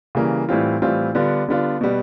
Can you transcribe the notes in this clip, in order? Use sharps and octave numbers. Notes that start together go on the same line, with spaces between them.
C#3 E3 G3 A#3
A2 E3 G3 C4 F4
A2 E3 G3 C4 F4
D3 G3 B3 D4 F4
D3 G3 B3 D4 F4
B2 G3 B3